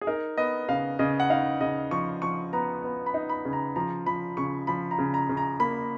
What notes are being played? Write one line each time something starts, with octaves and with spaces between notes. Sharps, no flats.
G#4
D#4 A#4
B3 D#5
C#3 F5
C#3 D#5
F#5
D#4 F5
C#3 D#5
F3 C#6
F3 C#6
B3 A#5
B3
B5
D#4
B5
C#3
A#5
F3 A#5
F3 B5
C#3 C#6
F3 B5
A#5
C#3
A#5
C#3
A#5
A#3 B5